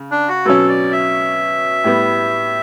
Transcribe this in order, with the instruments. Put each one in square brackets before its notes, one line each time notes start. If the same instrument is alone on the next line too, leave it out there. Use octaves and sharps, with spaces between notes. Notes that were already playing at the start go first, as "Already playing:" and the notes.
Already playing: [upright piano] C#3
[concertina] D4
F#4
[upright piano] B2 F#3 C#4 [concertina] A4
[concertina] D5
E5
[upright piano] A2 G3 B3